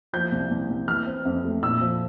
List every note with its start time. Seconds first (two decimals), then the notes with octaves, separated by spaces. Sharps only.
0.13 F3 G6
0.32 C2
0.51 C2
0.69 C2
0.88 E3 F6
1.07 C4
1.25 F2
1.44 A3
1.62 A#2 E6
1.81 F3